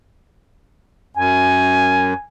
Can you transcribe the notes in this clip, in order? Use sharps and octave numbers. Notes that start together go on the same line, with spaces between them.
F#2 G#5